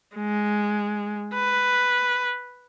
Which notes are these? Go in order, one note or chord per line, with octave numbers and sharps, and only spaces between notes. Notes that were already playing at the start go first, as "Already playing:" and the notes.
G#3
B4